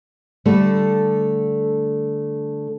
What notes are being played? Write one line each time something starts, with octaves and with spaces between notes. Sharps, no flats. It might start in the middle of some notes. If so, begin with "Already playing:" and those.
D3 G3 A3